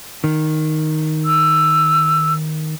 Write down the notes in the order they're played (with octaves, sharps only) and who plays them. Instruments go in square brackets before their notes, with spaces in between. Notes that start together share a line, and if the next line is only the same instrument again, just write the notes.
[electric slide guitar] D#3
[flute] E6